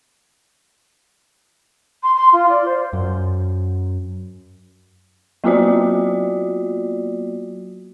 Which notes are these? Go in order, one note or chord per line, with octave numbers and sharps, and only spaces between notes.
C6
C6
F4
D5
C5
F#2
F#3 A#3 B3 F4 F#4 D5